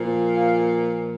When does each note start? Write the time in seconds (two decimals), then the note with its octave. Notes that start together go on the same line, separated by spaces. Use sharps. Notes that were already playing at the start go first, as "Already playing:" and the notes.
Already playing: A#2 F3
0.35 F5